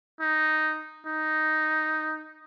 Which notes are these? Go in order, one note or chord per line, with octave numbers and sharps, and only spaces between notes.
D#4
D#4